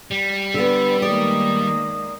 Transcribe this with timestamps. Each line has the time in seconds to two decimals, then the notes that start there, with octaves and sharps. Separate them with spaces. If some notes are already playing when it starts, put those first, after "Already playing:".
0.12 G3
0.54 D3 B3 E6
1.02 D#3 G#3 A#3 D5 D#6